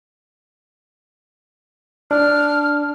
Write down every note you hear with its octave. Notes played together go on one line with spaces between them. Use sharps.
D4 F6